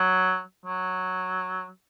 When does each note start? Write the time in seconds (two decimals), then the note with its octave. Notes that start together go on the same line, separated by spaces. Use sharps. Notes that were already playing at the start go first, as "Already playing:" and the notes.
Already playing: F#3
0.65 F#3